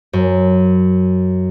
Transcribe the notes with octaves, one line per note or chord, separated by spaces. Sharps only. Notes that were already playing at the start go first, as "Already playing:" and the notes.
F#2